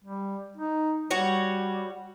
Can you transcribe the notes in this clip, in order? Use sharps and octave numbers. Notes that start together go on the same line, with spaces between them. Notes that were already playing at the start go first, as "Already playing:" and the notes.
G3
D#4
G3 F#4 C#5